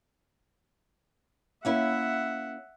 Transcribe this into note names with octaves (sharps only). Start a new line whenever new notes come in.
A#3 C#4 E4 E5 F#5